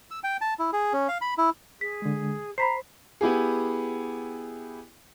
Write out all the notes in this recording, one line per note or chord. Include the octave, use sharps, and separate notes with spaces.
E6
G5
A5
E4
G#4
C#4
F5
B5
E4
G#4 B6
D3 G#3
C5 A#5 B5 B6 C7
B3 E4 G4 G#4